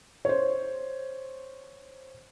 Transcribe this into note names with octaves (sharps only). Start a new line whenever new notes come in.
C5 C#5